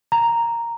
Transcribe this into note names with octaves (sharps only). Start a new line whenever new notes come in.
A#5